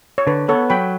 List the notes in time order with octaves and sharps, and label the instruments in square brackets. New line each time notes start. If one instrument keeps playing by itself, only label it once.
[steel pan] C#5
[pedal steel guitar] D3 [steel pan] B4
[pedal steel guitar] B3 [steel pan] A4 C#5
[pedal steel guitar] F#3 [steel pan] G5 B5